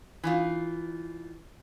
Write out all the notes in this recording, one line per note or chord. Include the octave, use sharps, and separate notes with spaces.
E3 D#4 F4